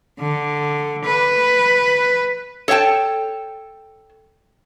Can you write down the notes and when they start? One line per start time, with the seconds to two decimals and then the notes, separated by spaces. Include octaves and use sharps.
0.20 D3
1.05 B4
2.68 A4 C#5 E5 G5 A5